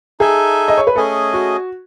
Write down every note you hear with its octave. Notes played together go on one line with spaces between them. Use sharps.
D#4 G#4 A4 E5 G#5
D#5
C#5
B4
A3 C#4 G#4 A4 D#5 G#5
F#4